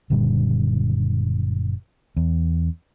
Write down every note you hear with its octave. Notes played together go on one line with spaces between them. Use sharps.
F#1 A#2 D3 G3
E2